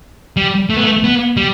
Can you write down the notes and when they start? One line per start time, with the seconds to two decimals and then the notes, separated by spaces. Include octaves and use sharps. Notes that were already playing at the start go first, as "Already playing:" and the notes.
0.37 G3
0.70 A3
0.77 B3
0.84 A3
1.04 B3
1.37 G3